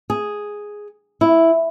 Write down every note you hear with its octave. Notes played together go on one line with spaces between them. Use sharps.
G#4
E4